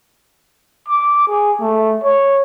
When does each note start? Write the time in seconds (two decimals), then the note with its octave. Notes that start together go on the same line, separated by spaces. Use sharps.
0.88 D6
1.28 G#4
1.60 A3
2.04 C#5